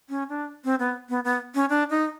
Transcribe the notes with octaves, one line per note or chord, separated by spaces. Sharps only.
C#4
D4
C4
B3
B3
B3
C#4
D4
D#4